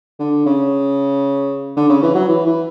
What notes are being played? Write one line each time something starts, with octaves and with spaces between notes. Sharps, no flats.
D3
C#3
D3
C#3
E3
F#3
E3
E3